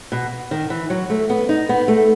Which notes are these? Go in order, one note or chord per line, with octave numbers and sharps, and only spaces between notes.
B2
D#3
E3
F#3
A3
B3
D#4
B3
A3